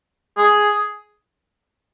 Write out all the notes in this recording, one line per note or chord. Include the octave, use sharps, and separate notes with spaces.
G#4